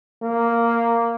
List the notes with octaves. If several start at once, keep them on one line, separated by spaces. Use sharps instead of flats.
A#3